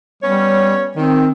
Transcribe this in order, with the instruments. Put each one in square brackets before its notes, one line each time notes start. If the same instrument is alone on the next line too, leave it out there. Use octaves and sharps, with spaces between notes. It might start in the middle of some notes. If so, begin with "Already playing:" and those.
[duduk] G3 [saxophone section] B3 C#4 C#5
[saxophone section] D#3 [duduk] C4